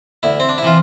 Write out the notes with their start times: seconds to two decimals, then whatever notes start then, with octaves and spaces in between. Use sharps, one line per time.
0.23 D2 E4
0.40 C4
0.49 D4
0.58 E4
0.63 C3 E3 F4